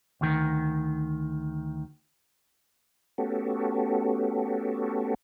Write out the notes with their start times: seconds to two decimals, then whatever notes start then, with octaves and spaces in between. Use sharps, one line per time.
0.21 D2 D#3
3.18 A3 B3 C#4 F#4 G4 A4